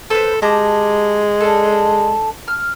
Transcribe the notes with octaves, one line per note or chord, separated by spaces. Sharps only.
A4 B4 C5
G#3 G4 A5 A#5
D4 A4
F6